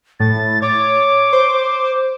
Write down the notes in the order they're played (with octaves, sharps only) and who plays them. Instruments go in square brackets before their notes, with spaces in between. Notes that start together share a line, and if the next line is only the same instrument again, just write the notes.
[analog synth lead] A2 [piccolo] A6
[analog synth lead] C#5 [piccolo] D6
[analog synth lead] C5